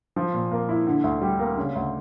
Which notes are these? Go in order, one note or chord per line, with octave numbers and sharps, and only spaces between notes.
F3
A#2
A#3
E4
D3
D2
G3
A#3
C#3
D2